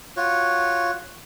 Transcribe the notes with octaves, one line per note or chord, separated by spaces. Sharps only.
F4 F#4 C#5